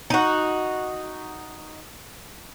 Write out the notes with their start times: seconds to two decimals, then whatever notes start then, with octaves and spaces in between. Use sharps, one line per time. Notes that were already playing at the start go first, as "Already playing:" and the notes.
0.10 D#4 F#4